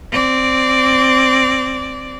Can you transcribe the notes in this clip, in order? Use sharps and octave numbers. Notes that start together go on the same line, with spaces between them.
C4 D5